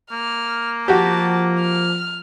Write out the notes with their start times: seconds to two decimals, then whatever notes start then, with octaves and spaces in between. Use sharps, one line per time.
0.12 A#3 F6
0.88 F3 F#4 G4 A5
1.61 F6